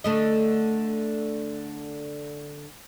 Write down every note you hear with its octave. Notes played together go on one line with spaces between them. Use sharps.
D3 A3 D#5